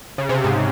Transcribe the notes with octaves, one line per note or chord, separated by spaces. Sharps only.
C#3
C3
G#2